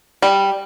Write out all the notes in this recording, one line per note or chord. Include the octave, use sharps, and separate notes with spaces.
G3